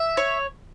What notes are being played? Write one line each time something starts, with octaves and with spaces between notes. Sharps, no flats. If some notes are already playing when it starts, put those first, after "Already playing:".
Already playing: E5
C#5